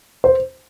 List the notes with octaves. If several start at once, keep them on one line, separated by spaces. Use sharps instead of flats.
C5